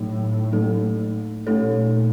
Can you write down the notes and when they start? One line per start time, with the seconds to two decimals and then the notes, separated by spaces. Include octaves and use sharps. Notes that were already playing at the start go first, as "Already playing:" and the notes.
Already playing: A2 F#3 A3 D#4
0.52 F#3 A3 D#4 A4
1.46 A#2 A3 D#4 A4 C#5